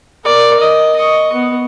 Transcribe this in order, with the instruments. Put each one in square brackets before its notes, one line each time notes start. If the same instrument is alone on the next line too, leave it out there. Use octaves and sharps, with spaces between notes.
[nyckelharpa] A#4 D5
D#5
D#5 C#6
B3